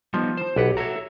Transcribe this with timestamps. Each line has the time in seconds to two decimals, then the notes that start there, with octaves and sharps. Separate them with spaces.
0.14 F3 G3 B3 D#4
0.37 C5
0.56 B1 G4 B4 F#5
0.77 F#4 A4 C#5 E5 A#5